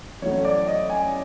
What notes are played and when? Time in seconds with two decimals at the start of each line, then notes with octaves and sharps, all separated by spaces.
0.22 A1 A2 F#3 A3 C#5
0.45 D5
0.67 D#5
0.90 G#5